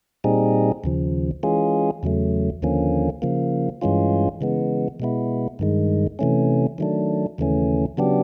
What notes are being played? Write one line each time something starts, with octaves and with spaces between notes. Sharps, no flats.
A#2 G3 C4 D#4 G#4
D#2 C#3 F3
E3 G#3 C#4 F4 G#4
E2 C#3 F#3 A3
D#2 D3 F3 A#3 C#4
C#3 F3 A#3
G2 E3 G#3 C#4 F4
C#3 E3 G#3 B3
B2 G#3 B3 E4
G2 D#3 G#3
C3 E3 A3 C#4
D#3 F#3 A3 D4
D#2 C#3 E3 A3 C#4
C#3 F#3 B3 D4 G4